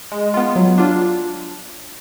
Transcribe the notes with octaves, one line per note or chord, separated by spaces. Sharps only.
G#3
B3 F4
F#3
D4 F4